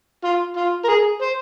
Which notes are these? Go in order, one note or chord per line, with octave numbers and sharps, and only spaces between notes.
F4
F4
A#4
G#4
C5